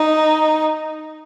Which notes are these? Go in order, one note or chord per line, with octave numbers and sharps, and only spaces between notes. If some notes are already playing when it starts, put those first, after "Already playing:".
Already playing: D#4